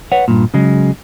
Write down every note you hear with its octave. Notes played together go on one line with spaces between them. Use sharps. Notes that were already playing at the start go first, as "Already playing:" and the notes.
B4 C#5 F#5
G2 A#2
C#3 F#3 G#3